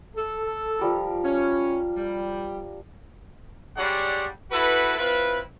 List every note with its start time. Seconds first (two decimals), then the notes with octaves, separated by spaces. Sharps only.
0.16 A4
0.79 F3 G3 A#4
1.24 C#4 F5
1.96 G3
3.77 G3 G#3 D4 C#5 F#5
4.51 E4 F#4 A4 B4
4.97 C4 E4 F4 B4